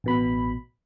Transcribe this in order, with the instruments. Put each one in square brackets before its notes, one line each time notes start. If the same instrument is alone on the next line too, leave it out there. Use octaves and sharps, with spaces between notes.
[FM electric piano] A1 B2 B5